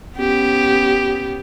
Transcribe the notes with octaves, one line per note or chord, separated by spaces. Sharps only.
B3 C#4 G4